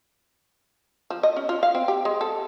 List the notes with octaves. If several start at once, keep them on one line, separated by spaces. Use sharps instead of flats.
F3
D#5
C#4
F4
F5
C4
G4
G#3
A4